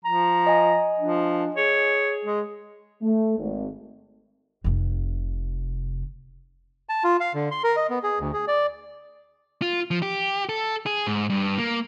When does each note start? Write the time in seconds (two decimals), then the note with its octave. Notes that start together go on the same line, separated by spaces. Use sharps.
0.05 F3 A#5
0.47 D#5 G#5
1.00 F3 D4
1.56 G#4 C#5
2.25 G#3
3.02 A3
3.39 G#1
4.64 F1 C3
6.89 A5
7.04 F4
7.20 F5
7.34 D3
7.51 C6
7.64 A#4
7.76 D#5
7.90 B3
8.03 G#4
8.20 D2
8.33 G#4
8.48 D5
9.62 F4
9.91 F3
10.02 G4
10.49 A4
10.86 G#4
11.07 G#2
11.30 G2
11.58 A#3